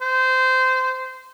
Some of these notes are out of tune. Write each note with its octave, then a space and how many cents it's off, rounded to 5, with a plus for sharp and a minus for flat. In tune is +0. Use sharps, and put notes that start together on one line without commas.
C5 -20